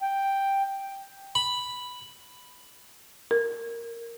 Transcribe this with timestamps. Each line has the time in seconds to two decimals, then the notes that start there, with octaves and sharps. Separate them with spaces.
0.02 G5
1.35 B5
3.31 A#4